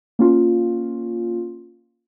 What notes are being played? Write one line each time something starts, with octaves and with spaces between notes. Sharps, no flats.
A#3 C#4 F4